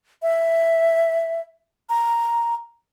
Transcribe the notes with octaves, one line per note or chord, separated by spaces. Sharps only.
E5
A#5